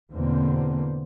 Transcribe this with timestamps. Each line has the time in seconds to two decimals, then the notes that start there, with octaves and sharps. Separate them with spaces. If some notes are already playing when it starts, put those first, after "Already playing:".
0.11 E2 B2 D3 A#3 C4